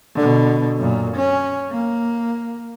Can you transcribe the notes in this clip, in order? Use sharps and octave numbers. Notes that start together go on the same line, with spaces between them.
B2 D3
F#2 A#2
C#4
A#3